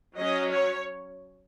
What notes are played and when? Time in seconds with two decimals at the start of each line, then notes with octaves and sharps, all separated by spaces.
0.16 F#3 C#4 D#5
0.52 C#5